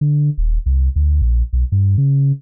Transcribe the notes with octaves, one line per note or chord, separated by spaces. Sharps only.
D3
D#1
C2
D2
A#1
B1
G2
C#3